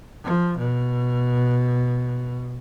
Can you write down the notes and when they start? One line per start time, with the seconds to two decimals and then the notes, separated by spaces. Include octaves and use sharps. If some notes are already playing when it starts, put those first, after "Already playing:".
0.24 F3
0.58 B2